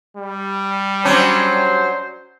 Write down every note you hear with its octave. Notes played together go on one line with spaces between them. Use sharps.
G3
F#3 C#4 D4 C5